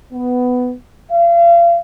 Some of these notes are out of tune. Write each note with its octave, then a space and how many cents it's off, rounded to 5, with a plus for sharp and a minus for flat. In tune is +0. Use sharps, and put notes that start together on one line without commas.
B3 +10
F5 -35